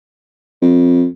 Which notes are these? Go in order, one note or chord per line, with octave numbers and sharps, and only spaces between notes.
F2